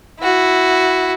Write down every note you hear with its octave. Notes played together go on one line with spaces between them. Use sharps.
E4 F#4